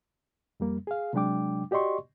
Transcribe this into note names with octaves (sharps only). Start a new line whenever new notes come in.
F2 G3 A#3
G#4 F5
C3 F#3 G#3 D4 G5 D6
F#4 G4 D5 D#5 C6 C#6